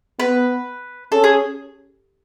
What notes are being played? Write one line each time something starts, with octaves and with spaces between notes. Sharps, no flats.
B3 B4
C#4 A4
G#4